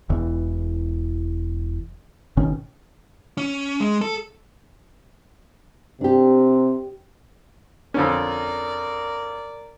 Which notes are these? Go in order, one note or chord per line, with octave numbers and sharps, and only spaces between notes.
E1 E2 E3
G#1 B2 D#3 C#4
C#4
G#3
A4
C3 D4 G4
F2 D3 C#4 A#4 D5